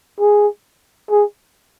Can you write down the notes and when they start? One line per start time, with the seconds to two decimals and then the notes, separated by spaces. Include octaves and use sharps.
0.20 G#4
1.10 G#4